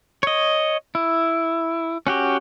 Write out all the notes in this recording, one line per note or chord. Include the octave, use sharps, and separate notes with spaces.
C#5 D#5
E4
C#4 F#4 G4